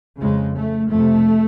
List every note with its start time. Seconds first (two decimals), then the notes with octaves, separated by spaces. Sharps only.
0.20 F2 C#3 G#3
0.57 A3
0.92 F2 A3
0.97 C3